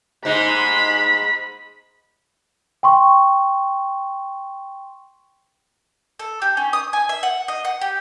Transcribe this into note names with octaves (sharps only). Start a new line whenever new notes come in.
G#2 G#3 D#4 B5
G5 C6 C#6
A4
G4
C#4
D#6
G#5
E5
F#5
D#5
F#5
G4